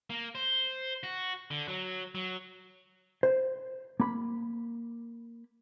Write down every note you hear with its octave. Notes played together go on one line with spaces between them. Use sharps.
A#3
C5
F#4
D3
F#3
F#3
C5
A#3 B5